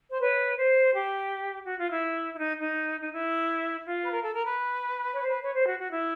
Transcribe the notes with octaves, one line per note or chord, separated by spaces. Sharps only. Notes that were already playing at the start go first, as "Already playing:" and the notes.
C5
B4 C#5
C5
G4
F#4
F4
E4
E4
D#4
D#4
D#4
E4
F4
B4
A#4
A4
A#4
B4
C#5
C5
B4
B4 C#5
C5
F#4
F#4
E4